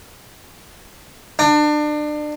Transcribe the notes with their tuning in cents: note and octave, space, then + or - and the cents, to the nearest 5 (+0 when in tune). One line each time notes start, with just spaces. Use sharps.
D4 +30